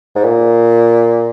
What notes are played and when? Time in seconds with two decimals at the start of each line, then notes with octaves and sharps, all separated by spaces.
0.16 G#2
0.24 A#2